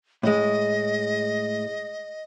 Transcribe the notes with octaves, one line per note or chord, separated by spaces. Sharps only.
A2 G#3 D#5